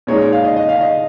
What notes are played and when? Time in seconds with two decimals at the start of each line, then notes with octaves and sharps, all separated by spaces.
0.07 A#2 G#3 D#4 C#5
0.32 F5
0.44 D#5
0.56 D#5
0.69 F5
0.81 D#5